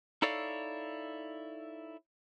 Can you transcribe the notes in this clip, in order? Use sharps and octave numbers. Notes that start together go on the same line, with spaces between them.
D#4 E4 A4 C#5 D5 F5